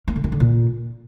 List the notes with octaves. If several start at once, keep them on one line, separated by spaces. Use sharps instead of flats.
A#3
D3
D#3
D3
A#2